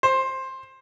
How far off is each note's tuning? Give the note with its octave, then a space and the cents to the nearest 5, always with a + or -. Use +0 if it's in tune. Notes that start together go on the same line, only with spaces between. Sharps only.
C5 +15